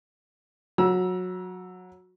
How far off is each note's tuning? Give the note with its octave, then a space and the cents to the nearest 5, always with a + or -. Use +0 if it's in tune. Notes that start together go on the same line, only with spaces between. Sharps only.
F#3 -20 A#5 +40 E6 +0